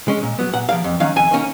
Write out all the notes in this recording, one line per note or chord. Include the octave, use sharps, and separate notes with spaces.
G#3 C#4
A#2
F#3 B3
A#2 F#5
F3 A#3 F5
F2
D#3 F#3 C#4 F5
F2 G#5
D#3 A#3 C#4